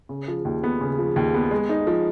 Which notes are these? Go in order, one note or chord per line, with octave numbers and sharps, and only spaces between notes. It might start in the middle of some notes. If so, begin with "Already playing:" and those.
C#3
F3
D#2
B3
C#3
F3
D#2
B3
G#3
D#4
F3